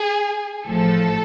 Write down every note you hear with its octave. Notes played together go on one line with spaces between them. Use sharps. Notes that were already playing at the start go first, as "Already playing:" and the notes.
Already playing: G#4
A1 A2 F3 A3 A4